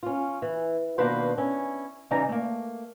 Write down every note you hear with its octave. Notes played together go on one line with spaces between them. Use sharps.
C#4 F4
E3
B2 D#3 A#3 D4 B4 C5
C#4 E4
C#3 E3 G3 D#4 G#5 A#5
A3 A#3